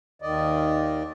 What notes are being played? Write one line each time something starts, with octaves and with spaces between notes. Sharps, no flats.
D#2 D#3 D5 D#5